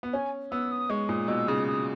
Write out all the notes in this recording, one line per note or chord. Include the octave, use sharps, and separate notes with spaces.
B3
C#4 G#5
B3 E6
D#6
G#3 C#6
A#2 D#6
B2 E6
C#3 D#6
D#6